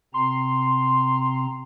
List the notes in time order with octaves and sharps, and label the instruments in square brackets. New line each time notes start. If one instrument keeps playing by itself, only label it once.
[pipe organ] C3 C4 A#5 [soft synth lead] C6